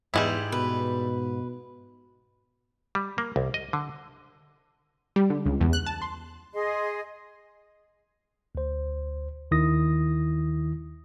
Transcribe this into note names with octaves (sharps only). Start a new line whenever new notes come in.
E2 G#2 G3 G#3 E4
B2 B4
G3
A#3
C2
D#5
D3
G3
D3
C#2
E2
F#6
A5
C6
G#4 D#5 C6
D2 C5
D#2 D#3 E4 D#6 A#6